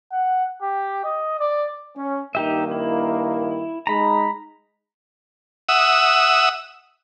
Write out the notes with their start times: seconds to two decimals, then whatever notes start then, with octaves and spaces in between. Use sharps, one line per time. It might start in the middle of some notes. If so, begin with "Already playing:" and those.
0.12 F#5
0.62 G4
1.05 D#5
1.40 D5
1.95 C#4
2.35 G2 D#3 A#3 D#4 G4 E5
2.71 E4
3.87 G#3 D#4 A#5 B5
5.69 E5 F#5 D#6 E6